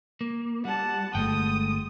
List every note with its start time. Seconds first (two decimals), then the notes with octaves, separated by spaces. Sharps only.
0.21 A#3
0.65 G3 F#5 A5
1.15 G1 G#3 A3 G5 D#6